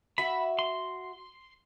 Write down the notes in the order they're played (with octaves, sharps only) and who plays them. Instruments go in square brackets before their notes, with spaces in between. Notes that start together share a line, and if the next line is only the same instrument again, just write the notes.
[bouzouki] F#4 E5 [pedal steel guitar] B5
[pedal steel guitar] C6